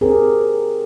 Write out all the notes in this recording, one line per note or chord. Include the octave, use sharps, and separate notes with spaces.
C4 G4 G#4 A#4